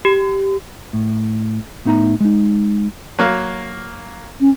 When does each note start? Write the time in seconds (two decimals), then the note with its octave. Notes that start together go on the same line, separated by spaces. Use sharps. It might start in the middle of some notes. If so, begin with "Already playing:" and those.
0.05 G4
0.93 A2
1.85 A2 B3 D#4 E5 A#5
2.20 G#3 D#4
3.19 F#3 A#3 F5
4.40 C#4